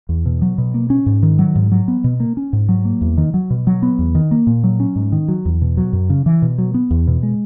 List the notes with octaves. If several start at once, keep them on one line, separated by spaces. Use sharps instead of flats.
E2
B2
F#3
B2
A#3
C#4
G#2
D#3
F#3
G#2
F#3
B3
B2
A#3
C#4
G#2
F#3
A#3
E2
D#3
F#3
B2
F#3
B3
E2
D#3
A#3
A#2
F#3
C#4
G#2
D#3
F#3
E2
B2
F#3
F#2
C#3
E3
B2
F#3
B3
E2
B2
G#3